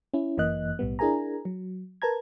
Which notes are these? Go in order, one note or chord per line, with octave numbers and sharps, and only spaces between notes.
C#4 E4
G1 F#2 E3 A#3 D#5 F#6
B1 A2 G3 B3
D4 E4 G#4 A#4 G#5 A#5
F#3
A#4 B4 A5 A#5 G#6